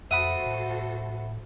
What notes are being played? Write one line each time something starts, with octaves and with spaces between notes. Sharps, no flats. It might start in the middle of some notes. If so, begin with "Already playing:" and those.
F2 F#4 A4 C5 E5 F#5 B5 D#6
A2